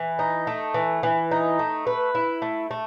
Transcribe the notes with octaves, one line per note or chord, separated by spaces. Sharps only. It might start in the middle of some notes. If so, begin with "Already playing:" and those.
Already playing: E3
D#4
A3
E3
E3
D#4
A3
B4
E4
A3
A3